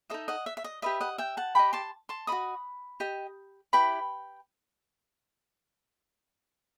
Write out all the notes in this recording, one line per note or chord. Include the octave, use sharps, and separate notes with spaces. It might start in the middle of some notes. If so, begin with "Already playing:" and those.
D#4 A4 D#5 E5
D#5 F#5
E5
E5
D#5
G4 B4 D#5 E5
D#5 F#5
E5 G5
F#5 A5
G4 D#5 G5 B5
A5 C6
A5 C6
F#4 A4 D#5 B5 D#6
G4 D#5
E4 G4 B4 G5 B5